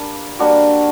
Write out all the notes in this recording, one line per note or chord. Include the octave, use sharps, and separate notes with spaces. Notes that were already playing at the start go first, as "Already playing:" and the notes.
Already playing: G3 A#3 D4
G3 A#3 D4 F#4